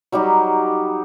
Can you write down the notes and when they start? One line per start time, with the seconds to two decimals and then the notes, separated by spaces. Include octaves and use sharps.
0.12 F#3 G3 D#4 G4